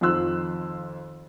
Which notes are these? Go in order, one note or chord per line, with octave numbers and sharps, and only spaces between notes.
F2 D#3 F4 C6 E6 F#6